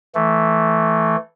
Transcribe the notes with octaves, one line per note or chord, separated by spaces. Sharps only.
E3 A3